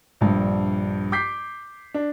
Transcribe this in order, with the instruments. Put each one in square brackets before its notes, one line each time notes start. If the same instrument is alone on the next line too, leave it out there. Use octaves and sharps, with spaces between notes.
[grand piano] A#1 G2
D6 G6 B6 C7
D4